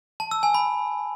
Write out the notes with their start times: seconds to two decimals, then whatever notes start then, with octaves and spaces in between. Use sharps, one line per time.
0.20 A5
0.31 E6
0.43 G#5
0.54 B5